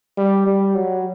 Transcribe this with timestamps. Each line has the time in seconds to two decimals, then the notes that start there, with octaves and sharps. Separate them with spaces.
0.17 G3
0.46 G3
0.75 F#3